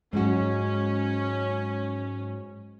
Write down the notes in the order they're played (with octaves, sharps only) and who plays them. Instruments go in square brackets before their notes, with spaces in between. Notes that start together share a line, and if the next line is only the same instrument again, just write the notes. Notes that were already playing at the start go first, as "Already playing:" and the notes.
[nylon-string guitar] G#2 F#3 F#4 [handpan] G#3 [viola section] C#4